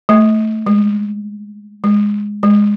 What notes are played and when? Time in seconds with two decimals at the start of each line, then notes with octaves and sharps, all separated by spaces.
0.09 A3
0.66 G#3
1.84 G#3
2.43 G#3